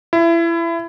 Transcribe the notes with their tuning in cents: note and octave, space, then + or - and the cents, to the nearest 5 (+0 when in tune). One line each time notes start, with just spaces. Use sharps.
E4 +25